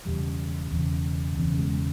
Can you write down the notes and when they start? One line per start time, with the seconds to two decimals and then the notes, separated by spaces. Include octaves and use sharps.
0.05 E1 E2 C#3 G3
0.71 E1 E2 C#3
1.36 E1 E2 C#3
1.58 G#3